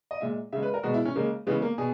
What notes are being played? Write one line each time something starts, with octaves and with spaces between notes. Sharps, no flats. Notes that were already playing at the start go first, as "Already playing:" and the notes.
D#5
A#2 G#3 E5
C#3 G#3 E5
B4
A#4
B2 G#3 F#4
E4
C#4
C#3 G#3 A#3
C#3 E3 G#3 B3
A#3
B2 G#4